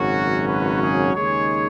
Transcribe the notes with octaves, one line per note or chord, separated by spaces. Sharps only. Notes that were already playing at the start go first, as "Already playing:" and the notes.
Already playing: G#1 F#2 C#3 F#3 C#4 F#4
F#4 B4
G#4 C#5
D#2 C#3 G#3 D#4 G#4 C#5